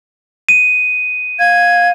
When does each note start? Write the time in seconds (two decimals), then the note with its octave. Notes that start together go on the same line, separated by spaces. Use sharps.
0.49 D#7
1.39 F5 G#6